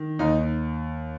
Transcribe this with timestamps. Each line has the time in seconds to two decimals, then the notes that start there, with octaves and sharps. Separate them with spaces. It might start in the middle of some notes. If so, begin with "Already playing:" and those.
Already playing: D#3
0.19 D#2 D#4